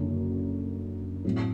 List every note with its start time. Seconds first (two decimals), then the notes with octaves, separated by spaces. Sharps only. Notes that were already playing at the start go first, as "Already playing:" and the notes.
Already playing: F#1 F#2 D3
1.24 A2 F#3 A3 C4 E4